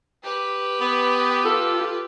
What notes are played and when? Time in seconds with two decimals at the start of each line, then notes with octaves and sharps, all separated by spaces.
0.23 G4 B4
0.81 B3
1.45 F4 A4